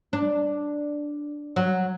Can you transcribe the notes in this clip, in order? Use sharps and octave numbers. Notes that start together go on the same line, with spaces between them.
D4
F#3